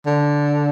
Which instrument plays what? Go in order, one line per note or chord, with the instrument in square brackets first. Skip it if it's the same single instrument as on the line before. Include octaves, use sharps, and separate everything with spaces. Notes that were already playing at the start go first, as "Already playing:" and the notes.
[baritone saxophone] D3